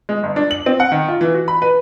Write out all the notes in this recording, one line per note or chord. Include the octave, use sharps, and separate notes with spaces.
G#3
G1
D4
F#7
C4
F#5
D#3
F4
E3
F#4
B5
B4